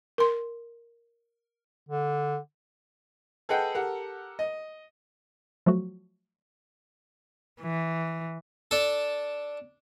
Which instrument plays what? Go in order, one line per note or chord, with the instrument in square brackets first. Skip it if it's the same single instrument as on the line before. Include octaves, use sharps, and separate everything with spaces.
[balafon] A#4 C6
[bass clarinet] D3
[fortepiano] G#4 A4 B4 D#5 F#5 G5
G4 A4 A#4 F#5
D#5
[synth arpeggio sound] F3 F#3 A3 F#4
[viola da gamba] E3
[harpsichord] D4 A4